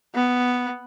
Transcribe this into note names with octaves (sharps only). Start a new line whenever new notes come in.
B3